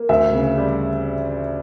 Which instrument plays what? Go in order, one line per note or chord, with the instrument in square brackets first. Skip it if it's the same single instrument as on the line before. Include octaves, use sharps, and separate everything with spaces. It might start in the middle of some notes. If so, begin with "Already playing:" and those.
Already playing: [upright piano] A#3
[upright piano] D2 [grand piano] E5
[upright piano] C#3
G3